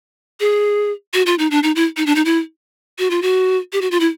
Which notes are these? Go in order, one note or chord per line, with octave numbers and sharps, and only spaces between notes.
G#4
F#4
F4
D#4
D4
D#4
E4
D#4
D4
D#4
E4
F#4
F4
F#4
G4
F#4
F4
E4